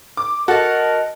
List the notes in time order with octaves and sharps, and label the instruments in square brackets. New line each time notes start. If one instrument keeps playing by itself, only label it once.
[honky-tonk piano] D6
[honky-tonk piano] F#4 [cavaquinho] A4 A5 [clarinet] A#4 [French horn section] D#5